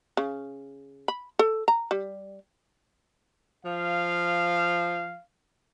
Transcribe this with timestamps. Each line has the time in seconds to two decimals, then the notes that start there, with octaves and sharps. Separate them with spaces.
0.17 C#3
1.08 B5
1.39 A4
1.68 A#5
1.91 G3
3.65 F3 F5